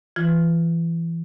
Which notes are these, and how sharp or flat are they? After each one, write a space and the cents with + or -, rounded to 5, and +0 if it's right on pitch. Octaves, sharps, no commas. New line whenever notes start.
E3 +15 F4 +0